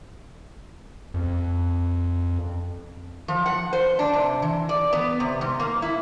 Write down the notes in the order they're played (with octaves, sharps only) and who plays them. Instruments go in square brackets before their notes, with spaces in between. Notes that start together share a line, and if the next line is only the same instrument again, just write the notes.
[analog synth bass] F2
[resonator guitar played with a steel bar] F3
F#5
C5
D4
C3
E3
D5
B3
C3
G#2
A#3
E4